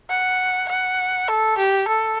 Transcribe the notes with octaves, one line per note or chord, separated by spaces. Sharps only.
F#5
F#5
A4
G4
A4